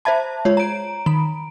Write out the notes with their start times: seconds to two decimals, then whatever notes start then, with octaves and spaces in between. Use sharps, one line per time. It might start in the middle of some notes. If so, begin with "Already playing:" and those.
0.05 C5 E5 A5 B5 G#6
0.45 G#3 F4 C#5
0.57 A#5 D7
1.06 D#3 B5